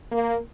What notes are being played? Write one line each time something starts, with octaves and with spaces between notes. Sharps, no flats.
A#3